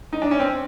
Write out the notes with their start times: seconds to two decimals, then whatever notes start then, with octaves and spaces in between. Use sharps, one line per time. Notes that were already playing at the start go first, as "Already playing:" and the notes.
0.13 D#4
0.22 D4
0.31 C#4
0.40 C4